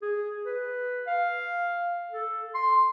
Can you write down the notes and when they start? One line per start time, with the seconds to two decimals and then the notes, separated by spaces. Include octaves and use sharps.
0.02 G#4
0.45 B4
1.07 F5
2.11 A4
2.55 C6